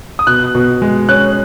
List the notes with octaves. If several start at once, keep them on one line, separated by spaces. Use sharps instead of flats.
D#6
B2 F#6
B2
G#3
C#4 F#6